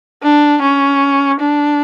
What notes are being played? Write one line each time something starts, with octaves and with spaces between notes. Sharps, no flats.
D4
C#4
D4